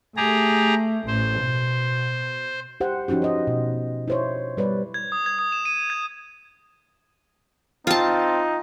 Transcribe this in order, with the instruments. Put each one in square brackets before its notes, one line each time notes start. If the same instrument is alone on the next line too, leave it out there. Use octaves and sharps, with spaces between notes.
[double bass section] A3 [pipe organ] G4 G#4 A#5
[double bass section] A1 [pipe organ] C5
[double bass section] B2
[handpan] G4 C5 F#5
F3 C#4 D#4 F#4 G4
C5 D#5
B2
E4 C5 C#5
G3 B4 C#5 D5
[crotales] G#6
D#6
G#6
D#6
E7
D#7
G#6
[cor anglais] C4 [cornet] D#4 [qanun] F4 A5